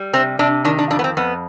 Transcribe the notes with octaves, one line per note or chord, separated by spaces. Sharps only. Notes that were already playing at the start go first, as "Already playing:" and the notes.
Already playing: G3
C3 C4
C3 D4
D#3 D4
D4
F2 D4
B3
C4
F2 B3